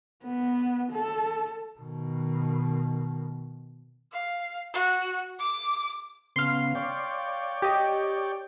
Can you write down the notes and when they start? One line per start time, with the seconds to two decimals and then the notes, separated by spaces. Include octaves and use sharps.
0.24 B3
0.92 A4
1.80 B2 D#3
4.12 F5
4.74 F#4
5.39 D6
6.36 C#3 B3 F5 C6
6.75 C#5 D5 G5
7.62 G4 D#5